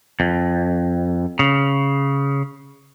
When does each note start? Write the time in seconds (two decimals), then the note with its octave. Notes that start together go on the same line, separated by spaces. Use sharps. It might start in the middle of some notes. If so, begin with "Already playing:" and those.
0.20 F2
1.39 C#3